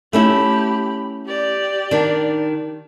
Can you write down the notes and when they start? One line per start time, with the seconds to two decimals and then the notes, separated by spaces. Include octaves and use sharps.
0.13 A3 C#4 E4 G4 B5
1.26 G4 D5
1.91 D#3 D4